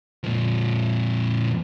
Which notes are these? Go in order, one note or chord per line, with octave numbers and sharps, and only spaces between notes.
F2 A#2